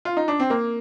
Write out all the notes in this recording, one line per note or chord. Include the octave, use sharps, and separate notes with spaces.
F4
D#4
D4
C4
A#3